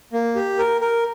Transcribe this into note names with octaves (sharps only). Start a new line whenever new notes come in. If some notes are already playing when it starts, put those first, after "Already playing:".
A#3
G4
A#4
A#4